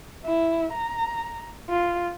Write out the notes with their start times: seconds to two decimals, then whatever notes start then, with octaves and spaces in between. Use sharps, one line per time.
0.25 E4
0.72 A#5
1.70 F4